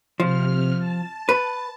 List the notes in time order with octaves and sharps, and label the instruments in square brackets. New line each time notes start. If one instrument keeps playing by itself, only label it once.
[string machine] C3 F6 [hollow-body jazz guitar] F3
[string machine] A5
[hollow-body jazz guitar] B4